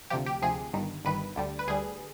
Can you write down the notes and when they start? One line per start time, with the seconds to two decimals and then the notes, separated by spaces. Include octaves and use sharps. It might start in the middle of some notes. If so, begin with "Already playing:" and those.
0.10 D2 C3 F3 G4
0.26 G4
0.42 D2 C3 F3 G#4
0.73 G1 G2 D#3
1.04 G1 G2 D#3 B4
1.36 D2 D3 G3
1.59 B4
1.68 D2 D3 G3 G#4